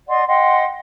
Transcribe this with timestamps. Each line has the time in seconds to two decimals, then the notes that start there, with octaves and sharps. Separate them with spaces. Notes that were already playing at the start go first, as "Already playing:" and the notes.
0.07 D5 D#5 F#5 C6
0.27 D#5 F#5 G5 C6